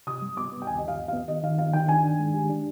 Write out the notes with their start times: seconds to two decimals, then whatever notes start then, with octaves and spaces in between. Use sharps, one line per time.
0.07 C3 D#6
0.22 G3
0.37 B3 D6
0.52 B3
0.62 G5
0.67 D#2 G#5
0.78 D#2 D#5
0.88 F5
0.98 D#2
1.08 F5
1.13 B3
1.28 D#3 D#5
1.44 D#3 F5
1.58 B3 F5
1.73 D#3 G5
1.88 D4 G#5
2.04 D4
2.19 G#3
2.34 G4
2.49 D4